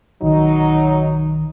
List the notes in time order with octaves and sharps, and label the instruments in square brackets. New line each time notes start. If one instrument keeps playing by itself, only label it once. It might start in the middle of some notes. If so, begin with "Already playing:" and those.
[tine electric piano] B1 D#3 [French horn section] F#3 D#4